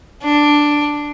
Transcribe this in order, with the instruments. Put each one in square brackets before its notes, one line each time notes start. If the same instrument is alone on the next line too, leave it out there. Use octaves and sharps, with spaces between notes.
[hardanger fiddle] D4